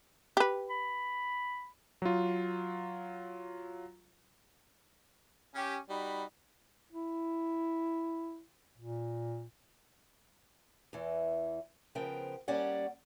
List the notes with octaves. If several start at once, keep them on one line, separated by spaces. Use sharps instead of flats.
G4 B4
B5
F#3 F4
C#4 G4
G3 D#4 F#4 B5
E4
A#2
E2 E3
C#3 F3 B3 A#4 C5 G5
G3 A#3 C#4 D5 F#5